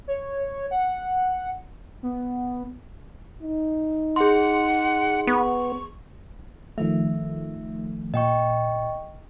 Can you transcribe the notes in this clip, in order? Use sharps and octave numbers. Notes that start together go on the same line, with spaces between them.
C#5
F#5
B3
D#4
G#4 F#5 C6
B3 C#6
D#3 F3 A3 E5
A#2 D#5 G5 C#6